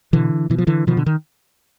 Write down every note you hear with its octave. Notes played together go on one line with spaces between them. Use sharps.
B2 D3 E3
B2 E3
F3
D3 E3
B2 D#3 F3
D3
D#3